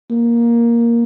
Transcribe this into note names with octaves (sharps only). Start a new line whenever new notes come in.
A#3